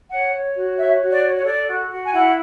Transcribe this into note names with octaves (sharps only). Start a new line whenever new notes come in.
C#5 F#5
C#5
F#4
C#5 E5
F#4
D5
C#5
C#5
A4 D5
F#4
F#4
G#5
E4 F#5